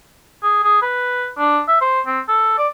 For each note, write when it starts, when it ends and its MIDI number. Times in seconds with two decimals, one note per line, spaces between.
0.43 0.63 68
0.63 0.81 68
0.82 1.28 71
1.38 1.60 62
1.68 1.76 76
1.81 2.01 72
2.07 2.20 60
2.28 2.54 69
2.58 2.68 74